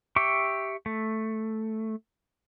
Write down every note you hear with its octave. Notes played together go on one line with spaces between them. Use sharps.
G4 E5 C#6 D6
A3